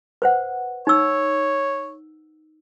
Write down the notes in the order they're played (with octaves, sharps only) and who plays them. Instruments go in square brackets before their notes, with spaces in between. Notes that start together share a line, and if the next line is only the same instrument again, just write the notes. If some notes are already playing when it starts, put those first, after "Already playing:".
[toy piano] B4 C5 F#5
[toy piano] D#4 E6 [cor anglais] C#5